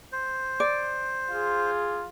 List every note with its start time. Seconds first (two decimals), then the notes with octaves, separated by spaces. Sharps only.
0.12 C5
0.60 D5
1.31 F4 G#4